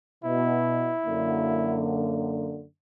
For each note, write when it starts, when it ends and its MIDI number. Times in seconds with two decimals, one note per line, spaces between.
0.24 0.91 47
0.24 1.85 64
1.06 2.63 42
1.06 2.63 50
1.06 2.63 58